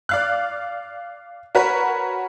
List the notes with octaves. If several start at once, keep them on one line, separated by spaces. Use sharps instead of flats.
D5 F5 F#6
F#4 A#4 B4 C#5